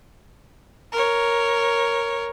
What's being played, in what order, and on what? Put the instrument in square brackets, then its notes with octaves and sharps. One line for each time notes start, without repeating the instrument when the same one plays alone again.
[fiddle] A#4 C#5